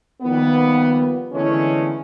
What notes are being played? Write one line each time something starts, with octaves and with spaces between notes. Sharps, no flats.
D#3 F3 G3 A#3 B3
D3 E3 G#3 A3 B3 C#4